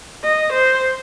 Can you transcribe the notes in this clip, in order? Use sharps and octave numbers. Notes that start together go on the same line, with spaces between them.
D#5
C5